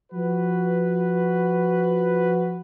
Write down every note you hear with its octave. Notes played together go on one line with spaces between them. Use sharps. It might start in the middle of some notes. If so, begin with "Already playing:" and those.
F3 F#4 B4